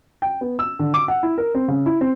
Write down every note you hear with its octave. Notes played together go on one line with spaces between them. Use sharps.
G5
B3
E6
D3
D6
F#5
E4
A#4
C4
C#3
E4
C4